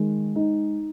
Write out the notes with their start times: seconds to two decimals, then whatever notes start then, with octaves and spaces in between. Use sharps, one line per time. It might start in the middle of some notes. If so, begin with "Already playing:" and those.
Already playing: D#3 G#3
0.36 D#4